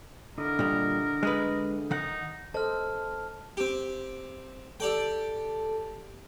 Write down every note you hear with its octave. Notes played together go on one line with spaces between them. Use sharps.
D3 E4 A#4 D#5
A#2 G3
G#3 G#4 B4
D#3 D#4 F#5
A4 C5 D#5 A5 F6
C4 G4
G4 A4 D5 G5